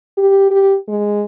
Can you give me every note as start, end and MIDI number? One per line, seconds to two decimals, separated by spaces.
0.18 0.50 67
0.50 0.75 67
0.88 1.24 56